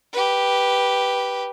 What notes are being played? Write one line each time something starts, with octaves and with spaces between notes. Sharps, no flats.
G4 B4